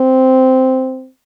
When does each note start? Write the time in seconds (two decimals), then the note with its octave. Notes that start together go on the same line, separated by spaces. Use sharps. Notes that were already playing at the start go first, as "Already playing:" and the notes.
Already playing: C4